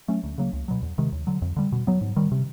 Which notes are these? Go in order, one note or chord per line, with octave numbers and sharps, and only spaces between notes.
F#3 A3 C#4
D2
C#3 F#3 A#3
C#2
B2 F#3
E2
C3 D#3 G#3
D#2
D3 F#3
F2
D3 G3
B2
F#3 B3
G#2
D#3 G3
C3